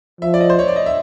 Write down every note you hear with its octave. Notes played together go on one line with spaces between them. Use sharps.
F3 E5
D5
D#5
C5
C#5
D5
D#5
E5